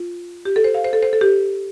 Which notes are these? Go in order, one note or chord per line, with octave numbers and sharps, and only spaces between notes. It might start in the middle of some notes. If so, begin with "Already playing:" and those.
Already playing: F4
G4
A4
C5
F5
C5
A4
C5
A4
G4